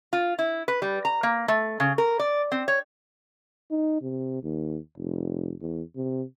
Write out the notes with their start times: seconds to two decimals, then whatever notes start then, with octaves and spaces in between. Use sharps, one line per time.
0.13 F4
0.39 E4
0.68 B4
0.82 G3
1.05 A#5
1.23 A#3
1.48 A3
1.80 C#3
1.98 A#4
2.19 D5
2.52 C4
2.68 C#5
3.71 D#4
4.01 C3
4.43 D#2
4.97 F1
5.61 E2
5.96 C3